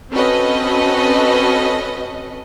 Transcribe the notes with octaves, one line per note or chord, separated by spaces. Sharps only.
C4 C#4 F#4 A4 B4 D#5